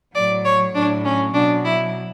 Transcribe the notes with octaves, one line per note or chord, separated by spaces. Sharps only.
A2 F#3 D5
C#5
A2 F#3 D4
C#4
B2 F#3 D4
E4